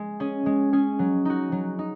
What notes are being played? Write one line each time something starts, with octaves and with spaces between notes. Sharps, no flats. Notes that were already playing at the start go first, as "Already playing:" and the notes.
Already playing: G#3
C#4 G#4
G#3
C#4 G#4
F#3
D#4 F#4
F#3
D#4